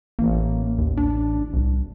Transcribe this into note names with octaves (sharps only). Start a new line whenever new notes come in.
A1 A#3
D#2
D4
C2